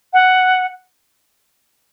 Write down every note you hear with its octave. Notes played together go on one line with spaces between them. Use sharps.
F#5